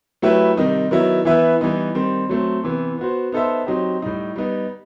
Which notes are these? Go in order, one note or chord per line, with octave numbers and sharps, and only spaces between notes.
F#3 A3 E4 G4 B4
C3 D#3 G3 D#4
D#3 F#3 B3 E4
E3 B3 E4 B4 E5
E3 G3 B3 D#4
D#3 G3 C4
F#3 A3 C4
C3 E3 B3
B3 F#4 C5
B3 D#4 A4 C5 E5
F#3 C4 D#4 G4
A2 G3 D#4
G3 B3 D#4